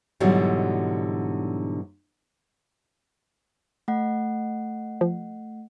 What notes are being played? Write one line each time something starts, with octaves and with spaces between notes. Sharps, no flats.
G#2 B2 D3 E3 F#3 G3
A3 F#5
F3